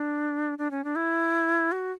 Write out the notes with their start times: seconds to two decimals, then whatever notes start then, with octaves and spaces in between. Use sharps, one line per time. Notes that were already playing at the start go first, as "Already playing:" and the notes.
Already playing: D4
0.58 D4
0.71 C#4
0.84 D4
0.96 E4
1.72 F#4